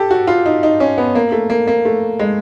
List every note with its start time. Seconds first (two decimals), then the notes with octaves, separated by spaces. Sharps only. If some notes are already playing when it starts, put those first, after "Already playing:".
Already playing: G4 A4
0.11 F#4
0.27 F4
0.46 D#4
0.63 D#4
0.80 C#4
0.98 B3
1.15 A#3
1.32 A3
1.50 A#3
1.68 A#3
1.85 A3
2.19 G#3